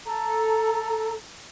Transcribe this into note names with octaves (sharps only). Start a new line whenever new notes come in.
A4 A#5